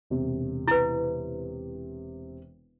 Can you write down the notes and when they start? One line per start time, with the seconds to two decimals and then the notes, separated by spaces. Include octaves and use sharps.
0.10 E1 C3
0.68 E4 B4